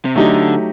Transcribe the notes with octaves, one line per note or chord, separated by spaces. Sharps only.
C3
D3 F#3 A3 D#4 G4